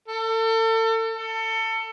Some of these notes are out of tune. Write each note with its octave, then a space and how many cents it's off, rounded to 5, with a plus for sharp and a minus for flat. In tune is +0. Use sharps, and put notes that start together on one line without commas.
A4 +35
A4 +25